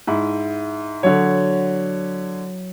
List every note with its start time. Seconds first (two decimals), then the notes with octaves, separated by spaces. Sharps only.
0.07 G#2 E4
1.03 D3 F#3 C#5